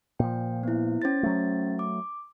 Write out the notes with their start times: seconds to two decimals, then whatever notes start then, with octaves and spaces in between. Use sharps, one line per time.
0.19 A#2 F3 G5
0.63 B3 E4
1.02 C#4 C5 A6
1.23 F#3 A3
1.79 D6